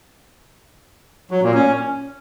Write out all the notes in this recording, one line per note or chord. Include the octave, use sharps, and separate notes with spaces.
F#3
A#2
C#4